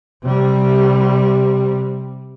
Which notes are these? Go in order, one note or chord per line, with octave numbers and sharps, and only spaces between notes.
C3 G3